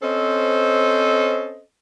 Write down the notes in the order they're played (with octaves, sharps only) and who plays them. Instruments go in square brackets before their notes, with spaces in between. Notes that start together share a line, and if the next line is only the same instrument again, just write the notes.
[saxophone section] C4 C#4 A4 C5 D#5